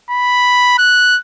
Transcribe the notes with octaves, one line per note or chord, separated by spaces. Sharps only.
B5
F#6